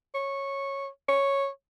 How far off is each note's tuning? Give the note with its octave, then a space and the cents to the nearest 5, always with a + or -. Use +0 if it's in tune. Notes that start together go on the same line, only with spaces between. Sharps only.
C#5 -10
C#5 -5